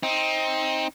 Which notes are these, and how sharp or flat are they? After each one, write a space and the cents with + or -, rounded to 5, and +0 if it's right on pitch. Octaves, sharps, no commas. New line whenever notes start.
C4 +15 D#4 +20